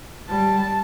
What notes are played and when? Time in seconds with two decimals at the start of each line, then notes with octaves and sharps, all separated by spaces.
0.28 G3 A5